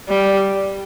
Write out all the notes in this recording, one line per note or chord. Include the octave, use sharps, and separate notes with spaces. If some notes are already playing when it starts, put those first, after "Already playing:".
G3